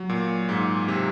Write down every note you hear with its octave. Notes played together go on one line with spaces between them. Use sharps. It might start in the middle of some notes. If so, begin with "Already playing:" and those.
Already playing: F#3
A#2
G#2
C3